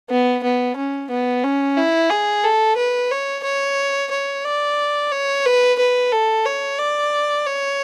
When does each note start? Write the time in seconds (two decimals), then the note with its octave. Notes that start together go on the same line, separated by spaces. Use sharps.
0.10 B3
0.44 B3
0.76 C#4
1.11 B3
1.44 C#4
1.77 E4
2.10 G#4
2.44 A4
2.77 B4
3.11 C#5
3.44 C#5
4.11 C#5
4.45 D5
5.12 C#5
5.46 B4
5.79 B4
6.12 A4
6.46 C#5
6.79 D5
7.46 C#5